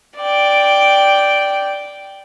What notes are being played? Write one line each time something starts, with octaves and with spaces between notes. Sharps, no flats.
D5 G5